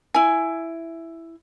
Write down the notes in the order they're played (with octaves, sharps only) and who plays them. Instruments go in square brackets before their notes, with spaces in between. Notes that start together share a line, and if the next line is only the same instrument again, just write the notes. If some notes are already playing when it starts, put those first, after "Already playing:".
[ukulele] E4 G#5